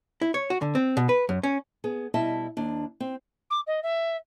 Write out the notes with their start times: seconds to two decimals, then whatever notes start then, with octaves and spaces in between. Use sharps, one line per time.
0.22 E4
0.34 C#5
0.50 F#4
0.62 D3
0.75 C4
0.97 B2
1.09 B4
1.29 F#2
1.43 C#4
1.84 B3 G#4
2.14 B2 G3 E4 D#5 E5 A5
2.57 D#2 D4
3.00 C4
3.50 D6
3.67 D#5
3.83 E5